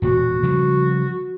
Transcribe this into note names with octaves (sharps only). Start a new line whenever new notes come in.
E1 A#2 F#4
C#3 F3 G3